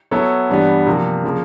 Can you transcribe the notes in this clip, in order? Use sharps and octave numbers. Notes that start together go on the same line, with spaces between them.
F#3 B3 E4 A4 C#5
G2 E3 G3 B3
C3 F3 A#3
C#3 F3 A#3